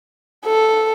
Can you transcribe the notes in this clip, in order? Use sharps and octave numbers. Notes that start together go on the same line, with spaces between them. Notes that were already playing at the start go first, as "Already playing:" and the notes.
A4